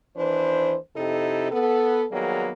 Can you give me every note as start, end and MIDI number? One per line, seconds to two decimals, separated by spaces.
0.17 0.75 39
0.17 0.75 52
0.17 0.75 62
0.17 0.75 71
0.17 0.75 72
0.96 1.49 41
0.96 1.49 48
0.96 1.49 63
0.96 1.49 64
0.96 1.49 67
0.96 1.49 69
1.52 2.05 59
1.52 2.05 69
2.12 2.52 51
2.12 2.52 54
2.12 2.52 55
2.12 2.52 58
2.12 2.52 59
2.12 2.52 68